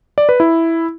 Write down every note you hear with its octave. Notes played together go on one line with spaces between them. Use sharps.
D5
B4
E4